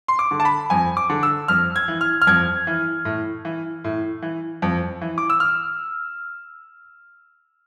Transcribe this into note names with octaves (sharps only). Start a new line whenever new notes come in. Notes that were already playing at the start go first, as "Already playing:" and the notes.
C6
D6
D3
A5
B5
F2 G#5
D6
D3
E6
F2 F6
G#6
E3
F6
F6
F2 G#6
E3
A2
E3
A2
E3
F2
E3
D6
E6
F6